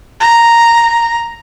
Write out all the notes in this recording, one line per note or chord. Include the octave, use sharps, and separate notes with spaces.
A#5